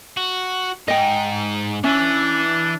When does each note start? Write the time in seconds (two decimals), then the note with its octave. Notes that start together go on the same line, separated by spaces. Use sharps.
0.17 F#4
0.88 G#2 D#4 D#5 G5
1.84 E3 C#4 D4 E5